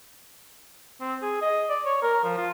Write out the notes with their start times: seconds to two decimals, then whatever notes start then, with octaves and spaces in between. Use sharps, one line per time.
1.01 C4
1.22 G#4
1.42 D#5
1.70 D5
1.86 C#5
2.02 A#4
2.24 F3
2.37 F4